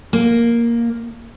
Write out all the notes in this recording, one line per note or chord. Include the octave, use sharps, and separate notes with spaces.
A#3